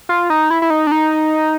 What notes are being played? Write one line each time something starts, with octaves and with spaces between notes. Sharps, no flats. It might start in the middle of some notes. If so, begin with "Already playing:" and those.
F4
D#4
E4
E4
D#4
D4
D#4